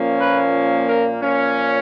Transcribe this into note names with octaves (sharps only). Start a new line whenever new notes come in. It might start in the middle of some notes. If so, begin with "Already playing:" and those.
Already playing: A#2 F3 A#3 C#4
B4
A#4
A#2 F3 A#3 C#4